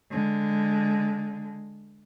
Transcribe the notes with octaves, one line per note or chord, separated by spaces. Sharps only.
D3 G#3